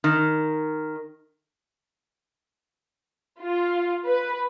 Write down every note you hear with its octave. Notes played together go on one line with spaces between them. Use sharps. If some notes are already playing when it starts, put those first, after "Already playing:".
D#3
F4
B4